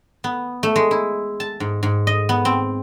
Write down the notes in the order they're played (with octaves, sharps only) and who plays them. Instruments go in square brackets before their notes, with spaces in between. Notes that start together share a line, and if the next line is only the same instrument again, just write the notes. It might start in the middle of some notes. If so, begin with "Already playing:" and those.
[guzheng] B3
A3
G#3
E4
A5
G#2
G#2
D#5
B3
C4